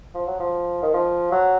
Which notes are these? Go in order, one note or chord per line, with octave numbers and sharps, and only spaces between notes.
F3
F#3
F3
D#3
F3
F#3